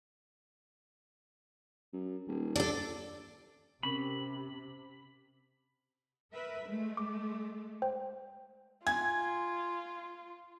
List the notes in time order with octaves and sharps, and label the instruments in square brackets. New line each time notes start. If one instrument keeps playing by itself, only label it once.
[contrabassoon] F#2
D#1
[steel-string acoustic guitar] D4 A4
[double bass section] C3 [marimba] C4 C#4 A#4 [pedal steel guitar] B5
[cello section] A#4 B4 E5
G#3 A3
[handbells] D6
C5 G5
[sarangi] F4 [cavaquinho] G#5 [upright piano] G#6